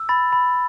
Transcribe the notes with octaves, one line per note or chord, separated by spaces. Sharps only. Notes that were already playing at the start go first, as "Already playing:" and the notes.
Already playing: E6
B5 A6
B5